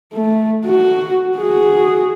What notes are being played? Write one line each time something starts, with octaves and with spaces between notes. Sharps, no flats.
A3
F#4
F#4 G#4